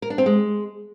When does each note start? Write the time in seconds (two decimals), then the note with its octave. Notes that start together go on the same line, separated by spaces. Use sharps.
0.02 A#4
0.10 D4
0.18 C4
0.26 G#3